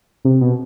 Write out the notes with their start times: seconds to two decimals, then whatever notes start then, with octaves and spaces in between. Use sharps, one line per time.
0.25 C3
0.41 B2